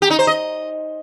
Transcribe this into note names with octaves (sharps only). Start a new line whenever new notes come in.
G4
D#4
C5
D#5